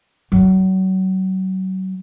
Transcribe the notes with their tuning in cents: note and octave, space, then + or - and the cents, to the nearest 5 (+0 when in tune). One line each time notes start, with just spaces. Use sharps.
F#3 +30